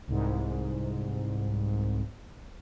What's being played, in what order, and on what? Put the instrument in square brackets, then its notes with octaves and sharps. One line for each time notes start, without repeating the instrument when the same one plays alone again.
[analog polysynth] C2 G#2